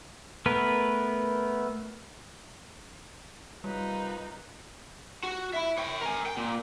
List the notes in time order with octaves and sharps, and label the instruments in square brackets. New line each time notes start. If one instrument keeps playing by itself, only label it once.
[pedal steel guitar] A3 B3 A#4 B4
[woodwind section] F#2 C3 B4 [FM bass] G3 [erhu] D#4 [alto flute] F4
[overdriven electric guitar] F#4
E4 E5
C#5 G5
A#4 G#5
G5
A#2